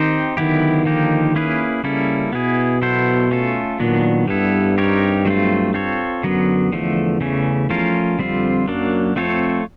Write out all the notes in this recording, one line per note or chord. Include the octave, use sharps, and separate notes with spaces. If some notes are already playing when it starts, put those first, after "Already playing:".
Already playing: D#3 C4 D#4 G4 C5
D3 D#3 F#3 B3 E4 G4
D3 F3 A#3 D#4 G4
A#3 C#4 E4 G#4 B4
C#3 G3 A#3 C#4 E4 A4
B2 B3 E4 G#4
F#3 B3 E4 A4 C5
A3 C#4 F4 A4
A#2 D#3 F#3 B3 D4
G2 G3 B3 E4 A4
C4 D#4 G4 A#4 C#5
F#3 A3 C4 F4
C4 F4 A4 C#5
F#2 D3 F#3 B3
E2 D3 F3 A3
C#3 E3 A3 C#4
F3 A3 C#4 F4 A#4
F2 D3 G3 C4 F4
F#2 F#3 A#3 D4
F2 A3 C4 F4 A4 C#5